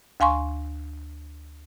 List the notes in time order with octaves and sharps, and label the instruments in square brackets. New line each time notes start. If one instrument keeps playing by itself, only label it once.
[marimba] D2 F5 G#5 C6 C#6